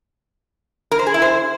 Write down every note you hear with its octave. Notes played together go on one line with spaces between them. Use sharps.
A#4
C5
G#4
E4
C5